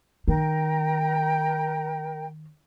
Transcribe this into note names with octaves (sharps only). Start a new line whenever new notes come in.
D#3 A#4 G5 A#5